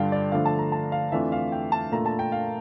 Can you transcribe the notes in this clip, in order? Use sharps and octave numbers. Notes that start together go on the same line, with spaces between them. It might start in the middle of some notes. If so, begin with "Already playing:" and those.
Already playing: G2 D3 G3 D4 F4 F5 G5 A5
D5
D3 F3 A3 D4 F5
A5
A#5
A5
F5
F2 E3 A3 D4 F4 E5
F5
G5
A5
A#2 A3 D4 F4 A#5
A5
G5
F5